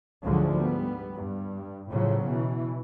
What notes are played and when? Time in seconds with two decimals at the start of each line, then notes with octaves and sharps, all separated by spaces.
0.23 D2 G#2 D3 F3 F#3 G#3
0.56 G3 B3
1.16 G2
1.90 A2 C#3 F3 F#3
2.25 B2 E3